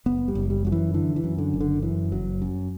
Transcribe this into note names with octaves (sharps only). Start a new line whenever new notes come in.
F#1 B3
G3
F#1
G3
F#2 F#3
E3
D3 E3
E3
F#2
D3
F#1
D3
F#2 E3
F#1 F#3
F#2